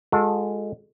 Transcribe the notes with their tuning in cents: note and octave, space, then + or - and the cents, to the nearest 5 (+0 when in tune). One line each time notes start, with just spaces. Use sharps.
G#3 +0 F#4 -45 A4 +0